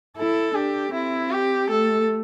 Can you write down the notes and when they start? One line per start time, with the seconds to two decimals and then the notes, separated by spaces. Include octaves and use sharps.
0.17 E4 A4
0.55 D4 G4
0.93 C4 E4
1.31 G4
1.70 A3 A4